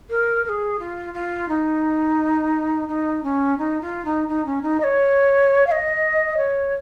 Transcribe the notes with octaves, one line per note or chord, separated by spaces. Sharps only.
A#4
A#4
G#4
F4
F4
D#4
D#4
C#4
D#4
F4
D#4
D#4
C#4
D#4
D#5
C#5
F5
D#5
C#5